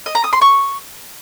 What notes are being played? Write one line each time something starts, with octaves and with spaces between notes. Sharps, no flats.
D#5
A#5
D#6
C6
C#6